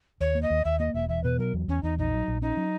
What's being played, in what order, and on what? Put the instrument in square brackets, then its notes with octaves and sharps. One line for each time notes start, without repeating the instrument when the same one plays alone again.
[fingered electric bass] D#2 [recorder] C#5
[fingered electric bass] A#3
[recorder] D#5
[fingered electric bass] D#2
[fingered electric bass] D#2 [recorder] E5
[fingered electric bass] A#3 [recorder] D#5
[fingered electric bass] E1 [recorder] E5
[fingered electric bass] E2 [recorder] E5
[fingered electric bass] B2 [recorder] B4
[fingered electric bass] F#3 [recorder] A#4
[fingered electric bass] E2
[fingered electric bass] E2 [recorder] C#4
[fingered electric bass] E2 [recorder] D#4
[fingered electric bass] A#1 [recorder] D#4
[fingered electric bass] F#3
A#1
[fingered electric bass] C#4 [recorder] D#4
[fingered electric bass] F#3